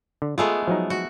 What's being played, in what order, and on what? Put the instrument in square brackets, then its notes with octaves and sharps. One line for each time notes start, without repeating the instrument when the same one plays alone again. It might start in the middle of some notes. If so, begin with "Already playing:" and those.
[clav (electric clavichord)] D3
[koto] G#3 A3 B3 [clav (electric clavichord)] F4 G#4 A4
[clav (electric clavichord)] F3 F#3 D#4
[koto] F#4